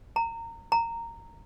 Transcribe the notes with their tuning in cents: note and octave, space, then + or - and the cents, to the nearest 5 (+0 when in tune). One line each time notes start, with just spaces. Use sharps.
A#5 -25
A#5 -15